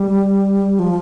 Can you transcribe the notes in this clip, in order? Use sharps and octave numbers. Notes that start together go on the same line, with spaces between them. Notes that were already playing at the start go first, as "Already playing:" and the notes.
Already playing: G3
F3